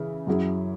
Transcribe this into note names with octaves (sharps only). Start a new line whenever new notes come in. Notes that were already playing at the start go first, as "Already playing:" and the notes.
Already playing: C#3 E3 E4
F#2 F#3 E4 G#4